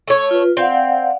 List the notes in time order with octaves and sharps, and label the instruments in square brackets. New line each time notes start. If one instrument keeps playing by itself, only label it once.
[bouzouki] A3 C#5
[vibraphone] F4 B4
[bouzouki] C4 [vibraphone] D5 F5 F#5